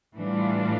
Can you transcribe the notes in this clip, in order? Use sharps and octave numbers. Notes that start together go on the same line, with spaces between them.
A2 E3 G3 D4 F4